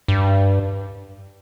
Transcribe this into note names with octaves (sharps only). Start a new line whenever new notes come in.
G2